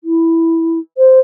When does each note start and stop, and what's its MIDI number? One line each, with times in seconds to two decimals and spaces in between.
0.04 0.79 64
0.98 1.20 72